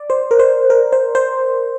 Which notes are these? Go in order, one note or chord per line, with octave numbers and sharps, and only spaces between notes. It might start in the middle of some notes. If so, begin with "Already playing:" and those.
Already playing: D5
C5
A#4
C5
A#4
C5
C5